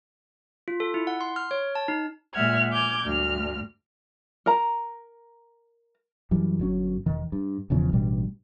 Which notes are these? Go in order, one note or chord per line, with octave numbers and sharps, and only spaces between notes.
F4
A4
E4
F#5
C6
F6
C#5
A5
D#4
A#2 G#3 E5 F#5 F6 G#6
G#5 D6 F6 G6 G#6
D2 G2 F6
A#4 A#5
F#2 E3 G3
G1 F#3 C#4
E1 D#3
G2
E1 E2 C#3 F3
A1 G2 B2 G3